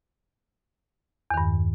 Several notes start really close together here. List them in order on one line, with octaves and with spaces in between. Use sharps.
E2 D#3 G2